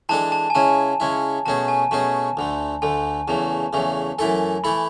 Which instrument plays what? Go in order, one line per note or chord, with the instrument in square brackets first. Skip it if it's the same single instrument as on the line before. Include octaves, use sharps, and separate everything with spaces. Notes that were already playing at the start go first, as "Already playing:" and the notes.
[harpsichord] E3 G#3 D4 A4 [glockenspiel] A5
[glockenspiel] A5
G#5
[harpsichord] C#3 G#3 C#4 E4 [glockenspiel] A5
[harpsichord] C#3 G#3 C#4 E4
[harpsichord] B2 A3 C#4 G#4 [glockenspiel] A5
[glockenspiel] G#5
[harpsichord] B2 A3 C#4 G#4 [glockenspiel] A5
[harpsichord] D2 D3 A3
[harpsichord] D2 D3 A3 [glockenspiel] G#5
[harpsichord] E2 C#3 E3 A3 [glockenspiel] A5
[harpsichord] E2 C#3 E3 A3
[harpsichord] F#2 E3 A3 E4 A4 [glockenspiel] G#5
[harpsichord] E3 A3 E4 A4 [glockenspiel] B5